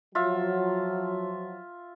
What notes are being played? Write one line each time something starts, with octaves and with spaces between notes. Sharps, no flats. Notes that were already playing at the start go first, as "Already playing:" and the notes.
F3 F#3 F4 E5